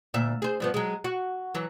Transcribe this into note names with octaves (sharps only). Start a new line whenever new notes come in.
D2 A#2 E5
G#4 C5
G2 F3 B3
F#3 G#3
F#4
E3 F#3